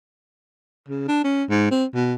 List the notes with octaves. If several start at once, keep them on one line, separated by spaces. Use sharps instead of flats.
C#3
D4
C#4
G#2
C4
B2